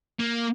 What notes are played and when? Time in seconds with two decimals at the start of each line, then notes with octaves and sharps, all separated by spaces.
0.20 A#3